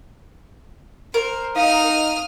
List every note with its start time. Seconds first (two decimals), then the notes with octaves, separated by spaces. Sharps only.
1.14 A#4 C5
1.56 D#4 F5 D#6 F6